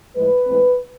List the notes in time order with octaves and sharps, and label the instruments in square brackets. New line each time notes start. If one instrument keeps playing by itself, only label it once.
[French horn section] A2 F3 G#3 B4
A2 E3 G#3 C4